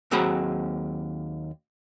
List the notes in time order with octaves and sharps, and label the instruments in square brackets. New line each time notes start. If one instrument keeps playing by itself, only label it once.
[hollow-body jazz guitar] D#2 F#3 C4 G#4 F#5 B5